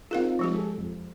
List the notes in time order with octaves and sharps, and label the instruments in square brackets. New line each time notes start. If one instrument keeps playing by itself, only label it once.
[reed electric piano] C4 D#4 F4 [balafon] G#4 A#4 F5
[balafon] F3 G#3 G4
[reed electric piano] G#4 A4
F2